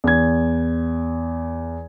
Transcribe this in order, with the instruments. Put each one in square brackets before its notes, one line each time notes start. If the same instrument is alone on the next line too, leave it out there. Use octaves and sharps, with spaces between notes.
[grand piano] E2 G#6